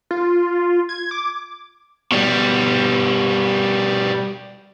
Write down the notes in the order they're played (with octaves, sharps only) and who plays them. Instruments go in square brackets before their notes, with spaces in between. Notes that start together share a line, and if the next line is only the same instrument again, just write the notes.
[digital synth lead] F4
G#6
D6
[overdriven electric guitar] B2 G3